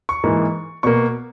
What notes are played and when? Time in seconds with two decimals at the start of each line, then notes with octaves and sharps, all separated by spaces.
0.09 C#6
0.24 G#2 E3 A#3
0.83 B2 A#3 C#6